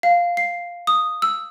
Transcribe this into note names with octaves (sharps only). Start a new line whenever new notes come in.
F5
C7
D#6
E6